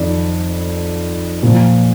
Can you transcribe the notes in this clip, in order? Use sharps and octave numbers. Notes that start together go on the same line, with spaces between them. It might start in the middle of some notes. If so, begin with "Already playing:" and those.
Already playing: F2 D#3 D5
A#2 F3